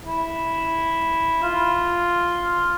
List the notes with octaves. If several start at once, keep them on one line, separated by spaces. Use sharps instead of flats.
E4
F4